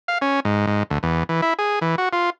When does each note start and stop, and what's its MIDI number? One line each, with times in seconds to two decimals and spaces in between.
0.08 0.18 77
0.21 0.40 61
0.45 0.66 44
0.67 0.83 44
0.90 0.99 38
1.03 1.24 40
1.29 1.41 52
1.42 1.54 64
1.59 1.79 68
1.81 1.95 52
1.98 2.09 66
2.13 2.30 65